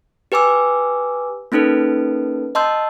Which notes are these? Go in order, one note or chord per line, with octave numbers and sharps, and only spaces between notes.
G4 B4 G#5 D6 E6
A#3 C#4 D#4 A4 B4
D#5 A5 C6 E6 G6